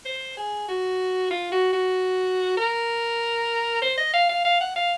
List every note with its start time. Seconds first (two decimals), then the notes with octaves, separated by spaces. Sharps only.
0.05 C5
0.37 G#4
0.68 F#4
1.31 F4
1.52 F#4
1.73 F#4
2.57 A#4
3.82 C5
3.97 D#5
4.14 F5
4.29 F5
4.45 F5
4.61 F#5
4.76 F5